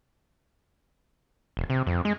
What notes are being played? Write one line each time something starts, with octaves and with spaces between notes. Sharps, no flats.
E1
C3
F2
G#3